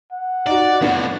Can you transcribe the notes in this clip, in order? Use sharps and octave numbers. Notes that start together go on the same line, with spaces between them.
F#5
D#4 F#4 D5
F2 A2 B3 D4